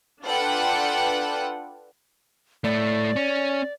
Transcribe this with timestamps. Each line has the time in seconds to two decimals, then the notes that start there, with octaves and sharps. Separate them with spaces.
0.23 D4 F4 A4 B4 F#5 G5
2.64 A2 A3 D5
3.16 C#4